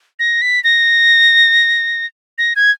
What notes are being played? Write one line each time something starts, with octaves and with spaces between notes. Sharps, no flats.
A#6
B6
A#6
A#6
G#6